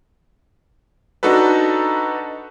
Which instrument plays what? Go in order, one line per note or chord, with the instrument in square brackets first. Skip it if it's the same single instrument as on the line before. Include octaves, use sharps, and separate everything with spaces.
[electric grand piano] D4 D#4 F#4 A4 B4